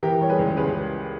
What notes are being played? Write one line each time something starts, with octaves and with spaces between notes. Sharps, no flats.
E3 G4 A#4
G3 C#5
G#4 B4
C#2
C#2 G#4 B4